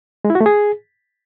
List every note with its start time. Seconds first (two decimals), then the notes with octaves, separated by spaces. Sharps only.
0.25 G#3
0.30 E4
0.35 F#4
0.41 A3
0.46 G#4